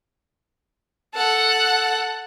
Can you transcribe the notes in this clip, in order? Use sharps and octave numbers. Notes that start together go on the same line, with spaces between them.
A4 F#5